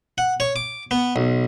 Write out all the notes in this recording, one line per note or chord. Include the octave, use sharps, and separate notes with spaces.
F#5
C#5
D6
B3
B1